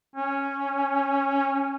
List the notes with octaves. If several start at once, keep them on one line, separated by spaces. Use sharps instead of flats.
C#4